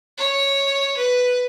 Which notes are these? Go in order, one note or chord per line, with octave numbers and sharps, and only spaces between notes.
C#5
B4